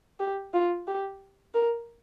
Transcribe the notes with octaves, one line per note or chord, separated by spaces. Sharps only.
G4
F4
G4
A#4